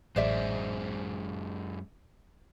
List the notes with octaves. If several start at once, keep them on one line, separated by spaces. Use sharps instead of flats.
A1 F#2 G#3 C5 D5 E5